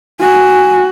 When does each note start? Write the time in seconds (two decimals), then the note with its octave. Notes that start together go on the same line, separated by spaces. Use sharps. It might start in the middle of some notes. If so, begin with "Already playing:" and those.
0.20 F#4 G#5